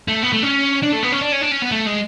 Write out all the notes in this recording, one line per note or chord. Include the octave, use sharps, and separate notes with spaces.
A3
B3
A3
C#4
D4
A3
B3
C#4
D4
C#4
D4
C#4
B3
A3
G#3